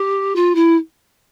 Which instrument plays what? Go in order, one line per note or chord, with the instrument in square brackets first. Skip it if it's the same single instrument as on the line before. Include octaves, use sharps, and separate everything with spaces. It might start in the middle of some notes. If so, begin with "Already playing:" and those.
Already playing: [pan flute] G4
F4
E4